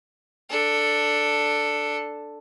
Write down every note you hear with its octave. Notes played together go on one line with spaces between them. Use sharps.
D4 A4